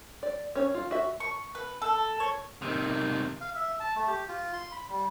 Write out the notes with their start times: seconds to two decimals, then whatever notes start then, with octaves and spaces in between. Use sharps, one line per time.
0.23 D5
0.55 C#4 C#5
0.74 F4
0.91 F#4 E5
1.20 C#6
1.55 B4
1.82 A4
2.20 C#5
2.62 C3 D#3
3.41 F5
3.55 E5
3.80 A5
3.95 A3
4.07 G4
4.28 F4
4.53 C6
4.72 B5
4.90 G3